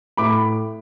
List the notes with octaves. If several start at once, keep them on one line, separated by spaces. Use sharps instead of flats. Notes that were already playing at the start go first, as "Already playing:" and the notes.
A2 B5 D6